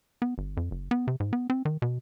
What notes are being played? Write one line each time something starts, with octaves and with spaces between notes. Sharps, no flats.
B3
G1
F2
F#1
B3
C3
G#2
B3
C4
D#3
B2